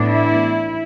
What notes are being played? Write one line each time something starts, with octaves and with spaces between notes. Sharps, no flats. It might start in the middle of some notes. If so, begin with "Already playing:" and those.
Already playing: A2 E3 B3 D4
E4